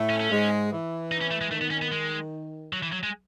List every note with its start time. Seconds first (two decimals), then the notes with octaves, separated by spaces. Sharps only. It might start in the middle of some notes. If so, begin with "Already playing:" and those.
Already playing: A2 A3
0.10 C#4
0.20 C#4
0.30 G#2 G#3
0.71 E3
1.12 D#4
1.21 C#4
1.31 A3
1.41 G#3
1.51 D#3 A3
1.61 B3
1.71 C#4
1.82 B3
1.92 G#3
2.73 F#3
2.83 E3
2.92 F#3
3.03 G#3